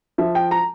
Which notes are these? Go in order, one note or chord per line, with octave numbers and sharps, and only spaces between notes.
F3 E5
G5
A#5